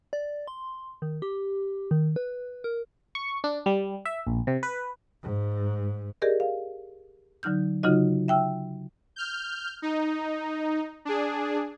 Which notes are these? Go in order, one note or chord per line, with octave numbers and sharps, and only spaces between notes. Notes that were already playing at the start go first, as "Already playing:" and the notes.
D5
C6
D#3
G4
D#3
B4
A#4
C#6
D4
G3
E5
A#1
C3
B4
G#2
G4 G#4 A#4 D5 D#5
F5
D3 F#3 D#4 F6 G6
C#3 F#3 D#4 F4 F#4 D#5
E5 G5 E6 F6
F6 G6
D#4
D4 G#4